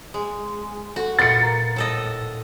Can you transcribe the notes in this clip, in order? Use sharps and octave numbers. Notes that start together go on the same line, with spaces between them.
G#3
F#4 A4
A#2 B3 F4 A6 C#7
A#4 A#5
A2 A4 D#5